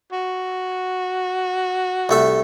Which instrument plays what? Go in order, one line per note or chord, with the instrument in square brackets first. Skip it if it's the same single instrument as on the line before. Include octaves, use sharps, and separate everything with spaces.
[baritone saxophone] F#4
[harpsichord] C2 A3 E5